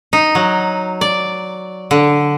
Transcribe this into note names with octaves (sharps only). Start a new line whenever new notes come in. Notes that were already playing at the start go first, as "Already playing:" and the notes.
D#4
F#3
D5
D3